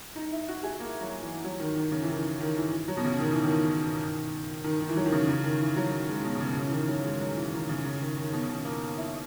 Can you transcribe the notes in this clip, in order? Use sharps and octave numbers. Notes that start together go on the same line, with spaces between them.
D#4
E4
F#4
G#4
A#3
F#3
E3
F#3
D#3
D#3
C#3
E3
D#3
D#3
E3
F#3
B2
C#3
D#3
E3
D#3
D#3
D#3
E3
F#3
D#3
C#3
C#3
D#3
E3
F#3
G#3
B2
B2
C#3
C#3
E3
D#3
F#3
G#3
F#3
E3
D#3
C#3
C#3
D#3
D#3
B2
C#3
A#3
E4